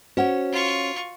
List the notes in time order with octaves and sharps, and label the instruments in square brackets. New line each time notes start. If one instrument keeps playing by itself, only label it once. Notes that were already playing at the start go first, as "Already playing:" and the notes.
[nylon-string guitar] C#4 C#5 [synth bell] F#4 C5 F#5
[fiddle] F4 C#6